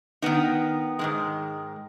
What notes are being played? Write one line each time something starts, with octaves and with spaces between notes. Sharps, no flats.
D#3 B3 D#4
G#2 D#3 G#3